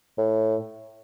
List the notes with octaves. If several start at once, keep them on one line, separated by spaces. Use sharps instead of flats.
A2